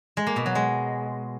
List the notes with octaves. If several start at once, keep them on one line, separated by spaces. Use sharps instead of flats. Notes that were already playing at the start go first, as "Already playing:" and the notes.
G#3
A#3
B2
F#3
G#3